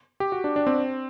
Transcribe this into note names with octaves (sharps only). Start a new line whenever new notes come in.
G4
F#4
D4
D4
C4